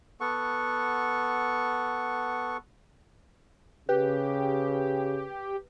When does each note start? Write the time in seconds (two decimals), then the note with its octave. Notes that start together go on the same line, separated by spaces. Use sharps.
0.21 B3 A4 F#5 C#6
3.89 C#3 G4 B4